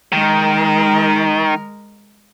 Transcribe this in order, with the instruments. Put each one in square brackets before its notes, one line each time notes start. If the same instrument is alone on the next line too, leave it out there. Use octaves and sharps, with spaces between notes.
[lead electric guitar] D#3 [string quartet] G#3 A#4